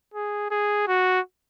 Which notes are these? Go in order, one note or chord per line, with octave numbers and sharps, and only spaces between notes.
G#4
G#4
F#4